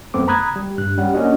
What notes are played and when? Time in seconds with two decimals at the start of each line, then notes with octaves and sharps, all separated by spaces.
0.14 F#2 A3 B3 C4 D6
0.28 A#5 B5 D#6 F#6 G#6
0.56 G3
0.78 G2 F#6
0.98 G3 C#4 F#5
1.14 A#3 C#4 D4 F#4 D#5